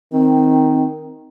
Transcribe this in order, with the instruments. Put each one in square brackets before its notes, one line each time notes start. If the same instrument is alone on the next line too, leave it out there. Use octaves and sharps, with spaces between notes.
[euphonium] D#3 [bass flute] C4